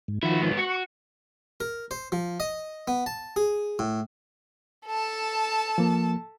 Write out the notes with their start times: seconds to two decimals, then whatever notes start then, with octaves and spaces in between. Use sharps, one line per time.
0.08 G#2
0.23 D#3 F3 E4 F#4
0.41 G#2 B3
0.57 F#4 C#6
1.60 A#4
1.91 C5
2.12 F3
2.40 D#5
2.88 B3
3.06 A5
3.36 G#4
3.79 A2
4.87 A4 A5
5.78 F3 A#3